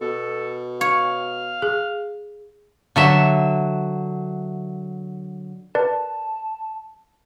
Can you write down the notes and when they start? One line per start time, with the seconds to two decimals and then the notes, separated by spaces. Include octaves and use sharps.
0.01 B2 A4
0.81 C#5 F5
1.62 G#4
2.96 D3 F#3 E5
5.75 A#4 B4 D5 A5